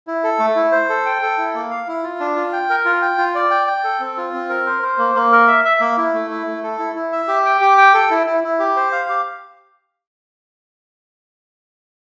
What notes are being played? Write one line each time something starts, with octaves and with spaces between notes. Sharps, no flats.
E4
A4
A3
E4
C5
A4
G5
A4
E4
A#3
F5
E4
F4
D4
F4
G5
A#4
F4
G5
F4
D5
G5
G5
A4
C4
F4
C4
A#4
C5
C5
A#3
A#3
A#4
E5
E5
A#3
E4
A3
E4
A3
A4
E4
E4
E5
G4
G5
G4
G5
A4
E4
E4
E4
G4
C5
F5
G4